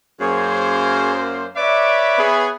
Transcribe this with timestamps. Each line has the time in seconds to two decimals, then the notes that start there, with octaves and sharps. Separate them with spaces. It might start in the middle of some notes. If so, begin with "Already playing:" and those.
0.20 F#2 A#3 G#4 C5 C#5
1.56 B4 C#5 D5 E5 D6
2.18 B3 G#4